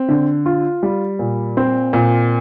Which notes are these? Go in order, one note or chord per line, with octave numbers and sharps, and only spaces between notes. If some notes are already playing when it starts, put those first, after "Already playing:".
Already playing: C4
D3
F4
G3
A#2
C4
A#2